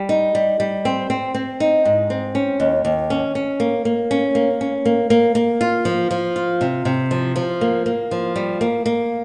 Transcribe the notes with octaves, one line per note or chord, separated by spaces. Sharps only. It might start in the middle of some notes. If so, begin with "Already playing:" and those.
Already playing: G3
D#4
G3
G3
C4
C4
C4
D#4
G#2
C4
C#4
D#2
D#2
C#4
C#4
A#3
A#3
C#4
A#3
C#4
A#3
A#3
A#3
F4
F3
F3
F4
C3
C3
F3
F3
A#3
A#3
F3
G3
A#3
A#3